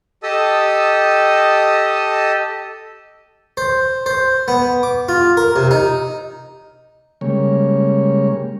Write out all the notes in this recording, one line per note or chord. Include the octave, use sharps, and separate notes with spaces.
G4 A4 D#5 A5 D#6 E6
C5
C5
B3
D6
F4
A#4
C3
D#4
C#3 G3 G#3 A#3 C#5